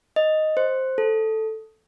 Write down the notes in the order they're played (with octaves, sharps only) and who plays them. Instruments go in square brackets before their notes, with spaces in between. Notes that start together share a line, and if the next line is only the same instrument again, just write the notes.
[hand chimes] D#5
C5
A4